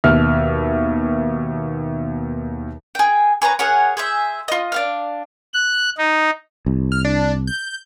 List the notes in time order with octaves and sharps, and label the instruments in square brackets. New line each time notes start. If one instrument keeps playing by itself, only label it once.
[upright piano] D#2 B2 E5 F6
[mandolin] G#4 G5
G#4 B4 C#5 A#5
G#4 A#4 C#5 F#5
G#4 C5 E5
F4 D#5
D4 F5 F6
[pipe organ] F#6
D#4
[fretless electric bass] C2
[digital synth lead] F6
D4
G6